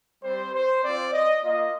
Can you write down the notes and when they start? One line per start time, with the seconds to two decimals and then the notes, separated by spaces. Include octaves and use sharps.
0.22 G3 C4 G4 C5
0.53 C5
0.83 C4 F4 D5
1.13 D#5
1.43 A#3 F4 D#5